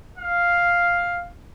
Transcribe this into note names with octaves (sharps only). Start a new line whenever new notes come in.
F5